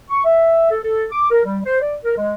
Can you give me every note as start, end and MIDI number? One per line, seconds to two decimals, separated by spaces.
0.09 0.23 85
0.25 0.69 76
0.71 0.79 69
0.84 1.05 69
1.12 1.27 86
1.31 1.40 70
1.44 1.59 55
1.65 1.80 72
1.81 1.95 74
2.04 2.16 70
2.17 2.35 56